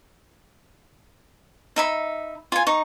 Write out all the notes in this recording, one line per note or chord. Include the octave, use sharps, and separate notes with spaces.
D#4 E5 B5
F4 G#5
D#4 C#6